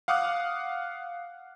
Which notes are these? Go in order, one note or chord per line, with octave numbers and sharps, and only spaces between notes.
F5 F#5 D6 D#6 F6 F#6